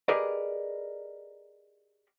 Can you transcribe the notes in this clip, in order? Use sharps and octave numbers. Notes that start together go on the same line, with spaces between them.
G4 G#4 A#4 B4 D5 D#5